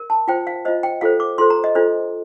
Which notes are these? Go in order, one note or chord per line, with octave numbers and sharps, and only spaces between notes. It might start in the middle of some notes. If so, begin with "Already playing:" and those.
Already playing: A#4
A5
F4 C5 G5
F5
F4 C5 D#5
G5
F4 A4 C5 F5
D6
F4 A4 C5 C6
A#5
D#5
D4 F4 A4 C5